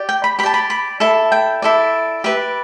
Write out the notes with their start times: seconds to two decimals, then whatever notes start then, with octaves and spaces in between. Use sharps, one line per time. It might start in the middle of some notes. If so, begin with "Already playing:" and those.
Already playing: G4 D5
0.09 G5
0.24 B5
0.39 G4 B5
0.43 D5 A5
0.54 B5
0.70 B5
1.00 E4 A4 D5 A5
1.32 G5
1.62 E4 A4 D5
2.24 G4 B4 D5 E5